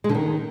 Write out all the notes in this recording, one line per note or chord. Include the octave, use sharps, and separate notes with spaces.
G#3
D3
D#3